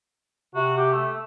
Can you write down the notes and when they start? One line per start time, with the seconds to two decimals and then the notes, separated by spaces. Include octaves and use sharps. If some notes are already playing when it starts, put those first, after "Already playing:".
0.55 C3 F#4
0.77 G4
0.92 A3